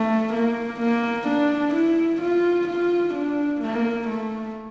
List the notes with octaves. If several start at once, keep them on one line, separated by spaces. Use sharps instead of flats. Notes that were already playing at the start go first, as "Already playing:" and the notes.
Already playing: A3
A#3
A#3
D4
E4
F4
F4
D4
A#3
A3